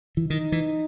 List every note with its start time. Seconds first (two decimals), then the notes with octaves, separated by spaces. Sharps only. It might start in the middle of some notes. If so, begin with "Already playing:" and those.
0.17 E3
0.29 D#3 D#4
0.52 E3